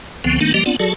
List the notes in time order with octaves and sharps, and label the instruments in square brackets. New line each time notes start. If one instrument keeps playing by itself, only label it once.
[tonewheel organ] C#2 D3 F3 B3 C4
D#3 A3 B3 D4 D#4
F3 G3 A#3 G4 D#5
B3 C4 D4 F4 D5 F#5
F#3 F#4 G#4 A4 D5 A5